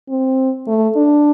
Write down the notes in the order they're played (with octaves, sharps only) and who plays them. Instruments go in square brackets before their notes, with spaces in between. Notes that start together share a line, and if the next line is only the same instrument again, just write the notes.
[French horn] C4
A3
D4